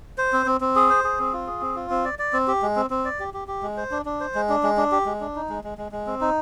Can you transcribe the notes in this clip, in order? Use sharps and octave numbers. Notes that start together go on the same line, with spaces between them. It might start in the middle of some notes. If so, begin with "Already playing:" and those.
C5
C4
C4
C4
G#4
C5
G#4
C4
F4
G#4
C4
F4
C4
D5
D5
C4
G4
G#3
C4
C4
D5
G4
G4
G4
G#3
C5
D4
D4
C5
G#3
D4
G#3
D4
G4
G#3
D4
D#4
G#3
G#3
G#3
G#3
C4
D#4